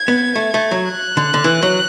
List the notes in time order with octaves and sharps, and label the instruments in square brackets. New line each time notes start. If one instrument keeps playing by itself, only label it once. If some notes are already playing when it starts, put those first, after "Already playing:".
Already playing: [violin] G#6
[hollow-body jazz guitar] B3
A3
A3
F#3
[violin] F#6
[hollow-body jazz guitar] D3
D3
E3
F#3